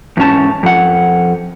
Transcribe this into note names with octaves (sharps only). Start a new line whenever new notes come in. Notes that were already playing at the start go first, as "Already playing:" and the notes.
E2 G#2 C#4 A5
F2 F#5